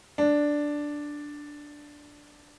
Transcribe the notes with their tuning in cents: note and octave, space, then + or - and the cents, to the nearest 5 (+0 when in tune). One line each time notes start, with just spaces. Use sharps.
D4 +0